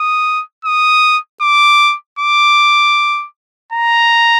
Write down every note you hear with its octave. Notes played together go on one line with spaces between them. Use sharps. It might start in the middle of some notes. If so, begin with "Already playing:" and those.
Already playing: D#6
D#6
D6
D6
A#5